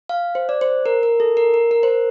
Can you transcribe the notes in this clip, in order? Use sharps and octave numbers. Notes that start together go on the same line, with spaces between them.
F5
C5
D5
C5
A#4
A#4
A4
A#4
A#4
A#4
C5
A#4